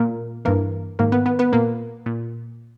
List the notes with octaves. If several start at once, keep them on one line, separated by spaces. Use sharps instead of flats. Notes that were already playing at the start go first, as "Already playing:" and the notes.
Already playing: A#2 A#3 A#4
G2 E3 A#3 A#4
G#2 D#3 A#3 A#4
B3 B4
B3 B4
B3 B4
A#2 A#3 A#4
A#2